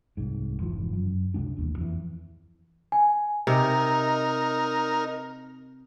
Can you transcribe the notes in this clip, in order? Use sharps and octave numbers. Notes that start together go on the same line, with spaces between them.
C2 G#2
F1 G#2 E3 F3
F#2
C#2 C3 G#3 D4
A1 D#2 A2
F2 E3
G#5
C3 D#4 A#4